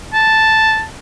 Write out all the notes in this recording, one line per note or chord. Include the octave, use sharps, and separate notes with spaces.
A5